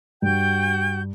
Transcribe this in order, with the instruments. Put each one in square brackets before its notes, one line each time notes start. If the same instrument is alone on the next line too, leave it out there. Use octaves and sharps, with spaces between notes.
[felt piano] G2 [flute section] F#4 G5 G6